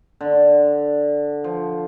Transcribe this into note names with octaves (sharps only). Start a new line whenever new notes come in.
D3
F3